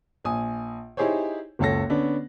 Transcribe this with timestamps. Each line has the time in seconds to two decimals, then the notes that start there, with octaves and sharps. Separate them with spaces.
0.25 A#1 G#5 D#6
0.97 D#4 E4 G4 G#4 C5 C#5
1.59 F#1 C#2 C#4 A4 A#6
1.90 D3 B3 C#4 D4